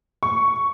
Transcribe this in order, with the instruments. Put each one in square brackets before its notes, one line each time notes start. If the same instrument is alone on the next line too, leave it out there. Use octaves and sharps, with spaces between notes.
[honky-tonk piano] C#6